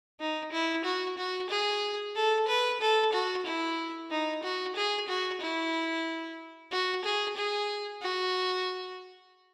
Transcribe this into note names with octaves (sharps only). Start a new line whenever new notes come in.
D#4
E4
F#4
F#4
G#4
A4
B4
A4
F#4
E4
D#4
F#4
G#4
F#4
E4
F#4
G#4
G#4
F#4